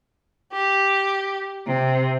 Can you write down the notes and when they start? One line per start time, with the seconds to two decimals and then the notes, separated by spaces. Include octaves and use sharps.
0.52 G4
1.66 C3